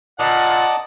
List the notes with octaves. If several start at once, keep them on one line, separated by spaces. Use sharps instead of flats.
A#2 D5 D#5 F#5 A5